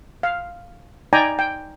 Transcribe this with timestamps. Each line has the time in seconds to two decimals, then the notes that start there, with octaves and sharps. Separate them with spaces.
0.23 F5
1.13 D#4 D5 G5 G#5 A#5
1.39 G5